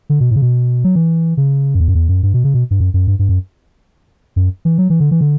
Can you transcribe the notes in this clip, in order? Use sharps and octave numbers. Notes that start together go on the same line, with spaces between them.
D3
B2
A2
C#3
B2
F#3
E3
C#3
F#2
E2
F#2
E2
F#2
G2
B2
C#3
B2
G2
F#2
F#2
G2
G2
F#2
F#2
E3
F#3
E3
D3
E3
D3